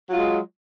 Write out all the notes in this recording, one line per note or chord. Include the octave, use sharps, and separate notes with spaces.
F#3 G#3 F4